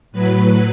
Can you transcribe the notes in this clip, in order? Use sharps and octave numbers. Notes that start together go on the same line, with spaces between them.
A2 F#3 B4